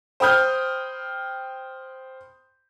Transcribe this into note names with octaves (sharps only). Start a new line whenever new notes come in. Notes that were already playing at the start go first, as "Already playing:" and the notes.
C5 G5 B5 D#6 F6 G6